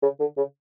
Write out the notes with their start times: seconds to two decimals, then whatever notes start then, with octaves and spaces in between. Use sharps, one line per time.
0.02 C#3
0.20 D3
0.37 C#3